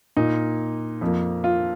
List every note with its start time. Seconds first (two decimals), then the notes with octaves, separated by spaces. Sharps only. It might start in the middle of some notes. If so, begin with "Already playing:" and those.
0.17 A#2 A#3 D#4
1.01 F2 F3 A#3
1.44 F4